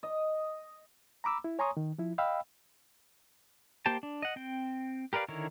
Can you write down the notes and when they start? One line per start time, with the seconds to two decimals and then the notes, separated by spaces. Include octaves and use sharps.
0.03 D#5
1.24 A#5 B5 D6 E6
1.44 E4
1.59 C#5 G#5 A#5 C6 C#6 D#6
1.77 D#3
1.98 F3 E4
2.18 D#5 F5 G5 B5 E6
3.86 A#3 G4 C5 G5 A5
4.03 D4
4.22 D#5 F#5
4.36 C4 G5
5.13 G4 A#4 B4 D5 F5
5.28 D3 D#3 E4 A#4 C#5